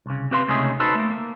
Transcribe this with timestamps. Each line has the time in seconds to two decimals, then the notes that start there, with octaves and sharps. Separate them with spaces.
0.06 C2 C#3
0.31 C4 G4 B4 F5 G#5 C6
0.48 C#2 C3 A3 C#4 D#4 G#4
0.80 D#4 F#4 A4 B4 C5
0.95 A3 A#3
1.11 A#3